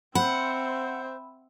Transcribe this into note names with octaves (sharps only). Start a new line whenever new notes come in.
C4 C5 E5 F#5 B5